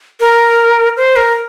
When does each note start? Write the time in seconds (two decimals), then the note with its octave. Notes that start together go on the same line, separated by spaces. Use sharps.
0.20 A#4
0.97 C5
1.16 A#4